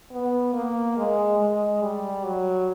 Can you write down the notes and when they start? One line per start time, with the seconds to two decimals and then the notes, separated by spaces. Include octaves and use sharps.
0.11 B3
0.53 A#3
0.97 G#3
1.40 G#3
1.82 G3
2.25 F#3